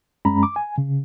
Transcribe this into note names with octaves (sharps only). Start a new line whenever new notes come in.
F#2 G#3 C#4 A#5 B5
D6
G#5
C#3